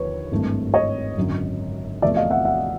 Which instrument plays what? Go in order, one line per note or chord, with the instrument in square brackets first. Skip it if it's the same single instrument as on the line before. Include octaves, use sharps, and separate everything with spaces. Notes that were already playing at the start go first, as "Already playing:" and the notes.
Already playing: [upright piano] D#2 D3 F3 B4 C#5
G#1 G2 E3 A3
C#5 D#5
G#1 F#2 D3
E2 C3 F3 A3 D5 E5
D#5 F5
E5 F#5
E5 F#5